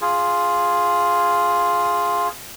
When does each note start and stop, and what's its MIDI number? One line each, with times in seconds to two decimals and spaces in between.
0.01 2.28 65
0.01 2.28 68